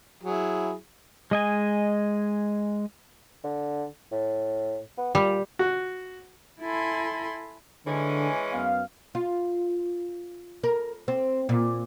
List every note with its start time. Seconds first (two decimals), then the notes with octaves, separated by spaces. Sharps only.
0.23 F#3 E4 G#4
1.31 G#3 D#5 G#5
3.44 D3
4.12 A2
4.97 B3
5.15 A#2 G3
5.59 F#4
6.61 E4 A4 G#5 B5 C6
7.86 D3 E3 G#3 C#4
8.53 F#2 B3 F5
9.15 F4
10.63 A#4
11.08 C4
11.49 A#2